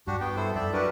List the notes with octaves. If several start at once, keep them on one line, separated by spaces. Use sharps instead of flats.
G2 D4 F#4 G4
B3 G5
E4 A4 C5
F#2 A4 D5 E5
D4 F#4 G4 A#4 B4